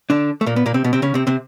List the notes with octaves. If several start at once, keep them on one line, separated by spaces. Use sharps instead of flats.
D3 D4
A3
A#2 A#3
B3
A#2 A#3
C3 C4
B2 B3
C3 C4
C#3 C#4
C3 C4
C3 C4